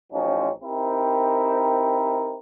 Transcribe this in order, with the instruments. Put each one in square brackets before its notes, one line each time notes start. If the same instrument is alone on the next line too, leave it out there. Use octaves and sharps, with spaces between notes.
[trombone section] A1 F3 F#3 C4 C#4 D#4
C4 D#4 E4 G4 A#4